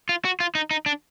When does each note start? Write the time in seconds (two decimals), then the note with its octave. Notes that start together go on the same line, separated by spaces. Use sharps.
0.09 F4
0.25 F#4
0.40 F4
0.55 D#4
0.71 D#4
0.86 D4